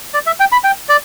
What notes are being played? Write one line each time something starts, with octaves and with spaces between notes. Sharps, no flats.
D5
E5
G5
B5
G5
D5